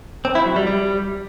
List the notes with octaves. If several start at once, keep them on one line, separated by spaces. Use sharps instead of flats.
C4
E4
F#3
G3
G3